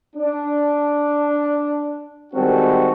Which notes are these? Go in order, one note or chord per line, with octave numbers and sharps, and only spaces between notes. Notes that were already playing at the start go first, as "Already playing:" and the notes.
D4
D#3 G3 G#3 C4 F#4 A4